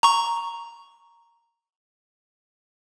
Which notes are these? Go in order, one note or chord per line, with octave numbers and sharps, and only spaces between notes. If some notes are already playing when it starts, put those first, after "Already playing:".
A#5 C#6